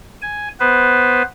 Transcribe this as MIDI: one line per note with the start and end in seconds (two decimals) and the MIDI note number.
0.22 0.48 80
0.60 1.22 59
0.60 1.22 71
0.60 1.22 72